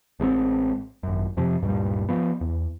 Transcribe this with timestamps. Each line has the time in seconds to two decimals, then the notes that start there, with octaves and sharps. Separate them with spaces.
0.20 A1 G#3 A#3 C4
1.03 G#1 F#2
1.37 F2 C3 F3
1.61 D1 G2 A#2 G3
2.09 F3 B3
2.41 E2